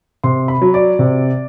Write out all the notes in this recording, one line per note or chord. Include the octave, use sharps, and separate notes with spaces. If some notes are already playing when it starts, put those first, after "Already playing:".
C3 C6
B5
F#3
D5
C3